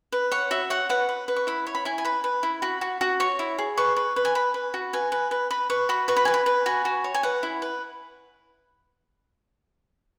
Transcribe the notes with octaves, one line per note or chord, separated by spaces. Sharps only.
B4
C#5 F#5
F#4 E5
C#5 F#5
B4 F#5
B4
B4
C#6
E4 B5
C#5
B5
E4 G#5
G#5
B4 B5
B4
E4
F#4 B5
F#4
F#4
C#5 C#6
E4
G#4
B4 C#6
B4
B4
G#5
B4 B5
B4
F#4
B4 G#5
B4
B4
B4 B5
B4 C#6
F#4 B5
B4 C#6
B5
B4 G#5
B5
B4
F#4 G#5
F#4
C#5
G#5
B4 F#5
E4
B4